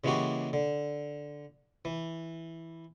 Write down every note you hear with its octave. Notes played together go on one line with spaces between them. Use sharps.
C#3 E3 G#3 A#3 F#4 G4
D3
E3